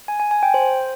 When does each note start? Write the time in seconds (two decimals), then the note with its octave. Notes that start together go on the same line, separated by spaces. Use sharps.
0.08 G#5
0.20 G#5
0.31 G#5
0.43 G5
0.54 C5